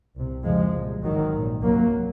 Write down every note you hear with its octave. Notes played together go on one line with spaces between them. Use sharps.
C2 C3
F#1 F2 C3 F3 G#3
C2 A#2
G#1 G#2 D#3 F#3
A#1 A#2
C#2 C3 F#3 A#3